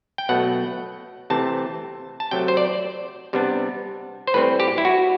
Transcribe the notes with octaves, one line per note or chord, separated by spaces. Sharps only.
G5
B2 F#3 A3 F#5
C3 E3 A3 C4 A5
A5
C3 F#3 A3 G5
C5
D5
C3 G3 B3 D4
C5
A2 G3 C4 B4
G4
E4
F#4